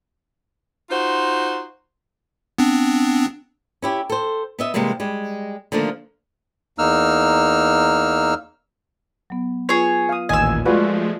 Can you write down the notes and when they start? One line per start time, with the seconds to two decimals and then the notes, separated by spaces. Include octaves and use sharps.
0.90 D#4 F4 F#4 C5
2.58 B3 C4 D4
3.82 C#4 E4 G4
4.09 A4 C5
4.59 B3 D#5 E5
4.74 C3 E3 G3 G#3 A#3
5.00 G3 G#3
5.72 D3 D#3 F3 A3 A#3
6.79 E2 A#3 D#4 E6 F6
9.30 F#3 B3
9.69 F4 G#4 B4 C#5
10.09 F5 D#6
10.29 A1 D#2 A#2 D#5 G#5 D#6 E6
10.65 F3 G#3 A3 F4 F#4 B4 D5